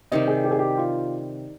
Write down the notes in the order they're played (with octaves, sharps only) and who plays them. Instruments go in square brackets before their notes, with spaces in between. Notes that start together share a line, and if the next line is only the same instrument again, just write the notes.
[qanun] C3 D#3 G3 [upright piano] D#5
[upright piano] G#4
G4
G#4
G4
F4